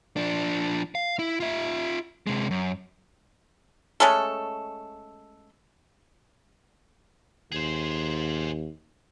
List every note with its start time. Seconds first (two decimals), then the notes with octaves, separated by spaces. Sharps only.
0.17 F3 D4
0.95 F5
1.19 E4
1.40 F4 E5
2.27 C3 G#3
2.51 F#2
4.00 G#3 A3 C#4 A4
7.52 D#2 G#4 C5